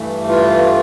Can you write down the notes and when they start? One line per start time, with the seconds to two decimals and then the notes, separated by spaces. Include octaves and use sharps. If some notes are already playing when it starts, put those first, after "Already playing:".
Already playing: G2 E3 A3
0.29 F4